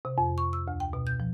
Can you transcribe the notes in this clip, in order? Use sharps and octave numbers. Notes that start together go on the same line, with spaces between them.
C3
F2
C#6
E6
D2
G5
B2
G6
F3